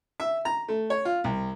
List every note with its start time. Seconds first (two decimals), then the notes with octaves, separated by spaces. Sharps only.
0.20 E5
0.45 A#5
0.68 A3
0.90 C#5
1.05 F4
1.24 C2